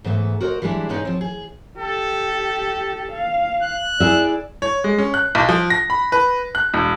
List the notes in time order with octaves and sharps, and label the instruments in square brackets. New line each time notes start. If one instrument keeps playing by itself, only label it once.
[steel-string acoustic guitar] G#2 E3 A3 B3 E5
F#4 A#4 C5 D5 D#5
E3 G3 G#3 D4 E4
G2 A#2 G#3 B3 C#4 D#4
F3 C4
G#4
[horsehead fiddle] G4 [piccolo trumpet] A4
[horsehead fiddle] F5
[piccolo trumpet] F#6
[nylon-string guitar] E4 G#4 E5 [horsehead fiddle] D5
[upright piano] C#5
G#3
C#4
F#6
B1
F3
A#6
B5
B4
F#6
E1